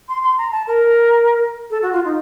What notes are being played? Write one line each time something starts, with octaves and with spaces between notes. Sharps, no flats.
C6
C6
A#5
A5
A#4
A4
F#4
F4
D#4